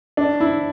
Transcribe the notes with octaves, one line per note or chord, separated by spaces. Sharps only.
D4
E4